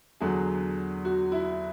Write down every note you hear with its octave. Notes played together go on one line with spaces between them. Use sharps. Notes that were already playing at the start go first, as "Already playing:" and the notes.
E2 D3 F#3 G#4
F#4
E4